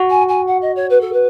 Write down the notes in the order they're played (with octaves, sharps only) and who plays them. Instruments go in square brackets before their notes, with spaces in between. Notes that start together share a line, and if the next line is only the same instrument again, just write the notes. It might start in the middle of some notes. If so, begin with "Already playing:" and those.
Already playing: [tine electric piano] F#4
[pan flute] G#5
G#5
F#5
D#5
C#5
B4
A4
B4